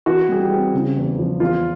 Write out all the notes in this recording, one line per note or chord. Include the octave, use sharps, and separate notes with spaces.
E3 F#4
G3 G#4
G4
C4
C#3
E2
F3
E2 F4